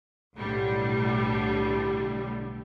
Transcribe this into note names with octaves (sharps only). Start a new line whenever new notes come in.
B1 A2 D3 G3